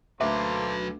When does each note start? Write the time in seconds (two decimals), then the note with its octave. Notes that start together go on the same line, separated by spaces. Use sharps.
0.21 D2 F#3 A#3 A4 B4 C5 E5 D6